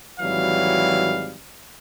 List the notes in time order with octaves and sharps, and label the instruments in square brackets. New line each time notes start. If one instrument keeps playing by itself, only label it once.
[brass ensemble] G#1 E3 F#3 G3 F5